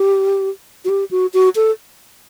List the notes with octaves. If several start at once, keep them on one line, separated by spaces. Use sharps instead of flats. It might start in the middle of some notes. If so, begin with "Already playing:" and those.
Already playing: G4
F#4
G4
F#4
F#4
A4